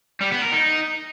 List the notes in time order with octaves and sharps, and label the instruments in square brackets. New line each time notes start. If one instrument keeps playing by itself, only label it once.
[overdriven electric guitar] G3
B3
A#4
D#4